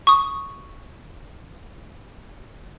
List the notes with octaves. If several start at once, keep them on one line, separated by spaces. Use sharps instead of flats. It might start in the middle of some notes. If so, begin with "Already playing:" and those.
C#6 D#6